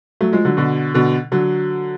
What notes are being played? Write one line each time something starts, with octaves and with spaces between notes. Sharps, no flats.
F#3 A3
F3 G#3
D3 F#3
B2 D3
B2 D3
D3 F#3